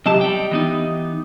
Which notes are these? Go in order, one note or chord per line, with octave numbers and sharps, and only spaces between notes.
C3 F#3 G4 D#5 A5
G3 G5
E3 B3 D#4